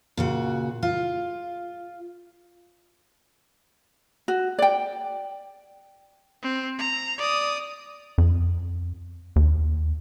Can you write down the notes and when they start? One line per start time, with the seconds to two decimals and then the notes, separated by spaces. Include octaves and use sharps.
0.17 A#2 C#3 F#4
0.83 F4
4.28 F#4
4.59 D5 G5
6.43 C4
6.79 A#5
7.18 D5 D#6
8.18 F2
9.36 D#2